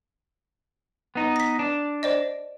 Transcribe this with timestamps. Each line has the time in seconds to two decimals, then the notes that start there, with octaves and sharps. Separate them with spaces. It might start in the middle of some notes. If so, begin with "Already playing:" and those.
1.15 B3 D#4
1.36 A#6 B6
1.59 D4
2.03 C5 D5 D#5